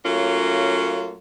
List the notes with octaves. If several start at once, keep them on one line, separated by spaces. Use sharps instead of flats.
F#3 A3 A#3 C#4 F4